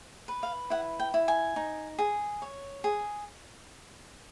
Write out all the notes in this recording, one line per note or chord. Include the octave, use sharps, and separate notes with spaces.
B4
F5
E4 F#5
G5
E4
G#5
D#4
G#4
C#5
G#4